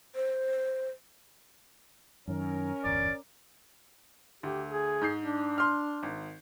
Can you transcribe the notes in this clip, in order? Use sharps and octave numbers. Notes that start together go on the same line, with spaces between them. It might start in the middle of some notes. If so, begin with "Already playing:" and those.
C5
F#2 D#3 C#4 A#4
D1 G1 E2 D5
D2 G4
G#4
G#2 G6 C7
D4
C6 F6
G#1